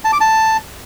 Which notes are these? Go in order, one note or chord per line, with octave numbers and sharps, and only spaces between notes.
A5
D6
A5